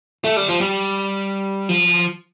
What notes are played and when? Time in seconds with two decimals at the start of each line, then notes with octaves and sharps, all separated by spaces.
0.24 A3
0.36 G3
0.49 F3
0.61 G3
1.69 F3